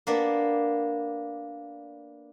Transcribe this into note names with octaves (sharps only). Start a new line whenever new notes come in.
A#3 B3 D4 D5